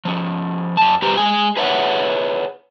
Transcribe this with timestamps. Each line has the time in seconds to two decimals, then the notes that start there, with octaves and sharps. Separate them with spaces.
0.05 F3 C#4
0.77 F#2 A5
1.02 G2 G4 B4 C5 A#5
1.17 G#3 G#4 G#5
1.57 G#4 B4 C#5 E5 F#5